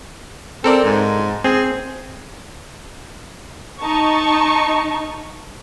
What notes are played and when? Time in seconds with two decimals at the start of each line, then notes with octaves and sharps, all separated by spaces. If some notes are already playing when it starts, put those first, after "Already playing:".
0.64 C4 A4 A#4 D5
0.84 G#2
1.44 C4 G#4
3.79 D#4 A5 C#6